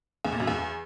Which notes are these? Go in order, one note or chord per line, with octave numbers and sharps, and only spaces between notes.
E2
A#2
F#2
E2